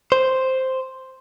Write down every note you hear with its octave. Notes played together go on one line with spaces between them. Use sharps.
C5